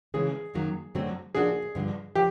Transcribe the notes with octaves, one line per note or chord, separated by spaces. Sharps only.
C#3 E3 G#3 C#4 G#4
F#2 D#3 F#3 A#3
F#2 D3 F#3 A3 C4
F3 A#3 D4 F#4 G#4
G2 D3 F3
F3 G4